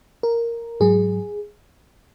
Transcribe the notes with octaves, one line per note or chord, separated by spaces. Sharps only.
A#4
G#2 F#3 G#4